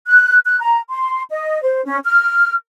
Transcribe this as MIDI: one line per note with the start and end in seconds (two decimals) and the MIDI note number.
0.07 0.38 90
0.46 0.59 90
0.60 0.78 82
0.89 1.22 84
1.30 1.60 75
1.62 1.82 72
1.85 1.98 61
2.05 2.54 89